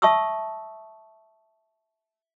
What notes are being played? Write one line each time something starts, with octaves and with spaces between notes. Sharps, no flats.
E5 A5 C#6 D#6 E6